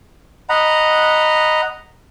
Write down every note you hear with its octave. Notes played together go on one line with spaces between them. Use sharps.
D#5 F#5 A#5 B5